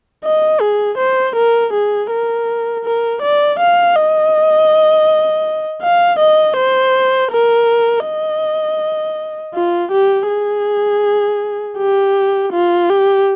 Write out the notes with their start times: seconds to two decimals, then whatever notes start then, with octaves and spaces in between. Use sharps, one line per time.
0.25 D#5
0.61 G#4
0.99 C5
1.36 A#4
1.73 G#4
2.11 A#4
2.85 A#4
3.22 D5
3.60 F5
3.96 D#5
5.82 F5
6.20 D#5
6.57 C5
7.32 A#4
8.06 D#5
9.55 F4
9.92 G4
10.29 G#4
11.79 G4
12.53 F4
12.90 G4